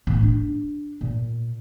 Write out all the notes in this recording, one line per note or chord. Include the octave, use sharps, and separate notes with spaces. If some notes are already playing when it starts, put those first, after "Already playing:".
A2
D4
A#2